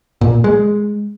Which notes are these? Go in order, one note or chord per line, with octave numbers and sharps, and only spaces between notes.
A#2
G#3